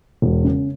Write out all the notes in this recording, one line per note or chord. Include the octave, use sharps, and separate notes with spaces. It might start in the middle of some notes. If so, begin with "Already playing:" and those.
E1
C#3